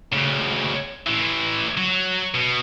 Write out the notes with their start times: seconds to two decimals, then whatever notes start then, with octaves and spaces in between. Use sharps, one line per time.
0.13 D2 C#3
1.07 A2 E3
1.77 F#3
2.34 B2